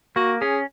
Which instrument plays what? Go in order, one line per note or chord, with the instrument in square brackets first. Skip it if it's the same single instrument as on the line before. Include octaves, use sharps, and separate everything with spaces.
[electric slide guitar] A#3 [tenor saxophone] F#4
[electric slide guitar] C#4 [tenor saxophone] G#4